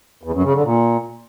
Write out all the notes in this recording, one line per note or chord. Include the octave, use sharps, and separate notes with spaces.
E2
F#2
C#3
D3
A#2